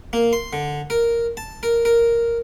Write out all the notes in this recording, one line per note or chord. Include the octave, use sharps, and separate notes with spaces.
A#3
C6
D3
A#4
A5
A#4
A#4